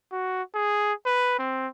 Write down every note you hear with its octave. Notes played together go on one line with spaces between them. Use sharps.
F#4
G#4
B4
C4